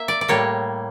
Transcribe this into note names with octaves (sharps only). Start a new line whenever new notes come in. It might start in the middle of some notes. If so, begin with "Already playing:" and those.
Already playing: A#3 E5
D5
D5
A2 G3 A#3 C#5